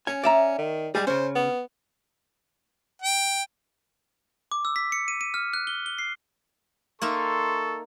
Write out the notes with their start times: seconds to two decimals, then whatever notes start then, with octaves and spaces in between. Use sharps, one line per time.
0.07 C#4 G#5
0.24 D5 E5 A#5
0.58 D#3
0.95 G3 G#3 G#4
1.07 C#3 C#4 C5
1.35 B3
3.02 G5
4.52 D6
4.65 E6
4.76 B6
4.92 C#7
5.08 D#7
5.21 D#7
5.34 F6
5.53 F#6
5.67 G7
5.86 G7
5.98 C7
7.02 A#3 D#4 A4 E5 C6 C#6